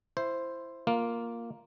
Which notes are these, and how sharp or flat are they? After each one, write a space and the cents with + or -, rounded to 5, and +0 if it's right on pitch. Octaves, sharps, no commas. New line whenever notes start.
E4 +15 C5 +0
A#3 +0 F4 +0